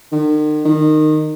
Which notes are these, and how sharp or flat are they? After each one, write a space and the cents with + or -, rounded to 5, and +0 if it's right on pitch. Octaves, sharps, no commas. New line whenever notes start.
D#3 -40
D#3 -15